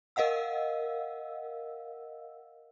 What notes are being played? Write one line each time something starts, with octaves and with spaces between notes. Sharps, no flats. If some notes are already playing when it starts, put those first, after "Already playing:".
A#4 D#5 F5 F#5 E6